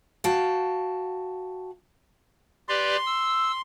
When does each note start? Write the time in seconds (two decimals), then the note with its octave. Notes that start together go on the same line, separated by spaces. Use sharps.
0.24 F#4 F5 G5 A5
2.69 G4 B4 D5 C6
3.06 E6